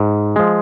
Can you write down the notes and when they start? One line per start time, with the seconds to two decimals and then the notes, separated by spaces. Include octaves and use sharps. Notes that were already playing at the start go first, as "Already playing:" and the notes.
Already playing: G#2
0.36 F3 G#3